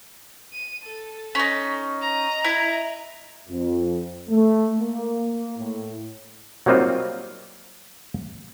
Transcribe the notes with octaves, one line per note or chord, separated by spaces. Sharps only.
D#7
A4
C#4 D#4
D#5 A#5
E4
F2
A3
A#3
A2
F#3 G3 A#3 C4 D#4 F4